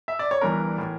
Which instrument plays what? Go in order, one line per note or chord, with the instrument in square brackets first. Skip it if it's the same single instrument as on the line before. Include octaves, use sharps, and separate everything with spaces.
[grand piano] E5
D5
C#5
G1 G2 E3 A#4
A2 E3